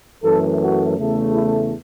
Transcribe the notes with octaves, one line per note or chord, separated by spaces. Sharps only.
F#2 E3 A3 A4
F#4
E2 C#3 A3
E4